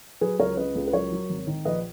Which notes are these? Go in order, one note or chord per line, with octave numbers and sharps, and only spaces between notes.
F#3 G#4 B4
C#2 A#4 C#5
C#3 B4 D#5
C#2
B4
F#3 A#4 C#5
F#3
G#1
D#3
A#1 B4 D#5